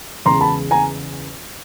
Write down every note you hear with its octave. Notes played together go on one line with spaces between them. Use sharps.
E2 C#3 E3 G#3 A#5 C6
A5 B5
G#5 A#5